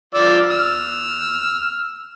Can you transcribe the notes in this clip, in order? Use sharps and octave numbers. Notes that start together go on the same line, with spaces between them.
F3 D5 E6
E6 F6